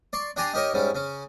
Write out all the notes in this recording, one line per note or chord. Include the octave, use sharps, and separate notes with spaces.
D5 C6 C#6
D4 G4 D5 G#5 A#5 C6
D#4 G4 A#4 C#5 D#5
G#2 G3 C#4
C#3 C#4